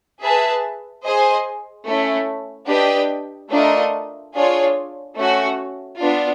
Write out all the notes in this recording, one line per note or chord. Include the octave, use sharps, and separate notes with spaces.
G#4 B4 E5 A5
G#4 C5 D#5 G#5
A3 C#4 E4
D4 G4 B4 D#5 G5
A3 D4 F4 A#4 D#5
D4 F4 G#4 C#5
A3 C#4 F#4
B3 D4 F4